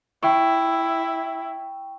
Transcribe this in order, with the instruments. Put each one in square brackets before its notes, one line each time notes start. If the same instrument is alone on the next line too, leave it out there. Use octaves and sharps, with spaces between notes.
[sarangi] E4 [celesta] G5 C#6